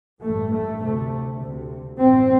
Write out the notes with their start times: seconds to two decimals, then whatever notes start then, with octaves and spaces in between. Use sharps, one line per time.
0.21 A1 G2 A3
0.51 A3
0.81 D2 C3 A3
1.41 D2 C3
2.00 A1 G2 C4